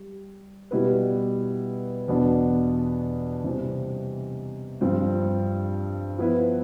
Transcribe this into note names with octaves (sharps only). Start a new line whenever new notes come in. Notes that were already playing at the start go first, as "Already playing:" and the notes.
Already playing: G3
B2 G3 B3 E4 B4
E2 B2 B3 D4
C3 E3 G3 C4
G2 F3 C4
F3 B3 E4 B4